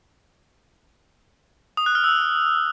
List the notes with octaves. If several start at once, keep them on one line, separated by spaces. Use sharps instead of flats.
D#6
F#6
F6
E6